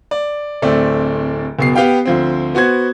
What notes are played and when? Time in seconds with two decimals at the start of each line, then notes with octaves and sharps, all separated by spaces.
0.11 D5
0.62 D1 A3 C4 D5
1.59 F#1 B2 C7
1.75 B3 G4 F5 G5
2.05 D2 F3 C4
2.55 B3 F#4 C5 G#6